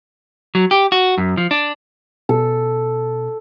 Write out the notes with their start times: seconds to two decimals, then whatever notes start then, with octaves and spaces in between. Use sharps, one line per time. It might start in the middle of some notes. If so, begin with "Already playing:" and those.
0.55 F#3
0.71 G4
0.92 F#4
1.18 F#2
1.37 F3
1.51 D4
2.29 B2 A4